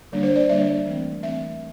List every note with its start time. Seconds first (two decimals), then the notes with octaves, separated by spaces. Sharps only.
0.12 D3 G3 A#3 D4
0.23 C5
0.35 D5
0.49 D3 G3 A#3 D4 E5
0.86 E3 A3 C4
1.23 E3 A3 C4 E5